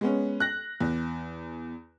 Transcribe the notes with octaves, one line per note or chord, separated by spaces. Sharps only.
G#3 B3 C#4
F#6 A#6
E2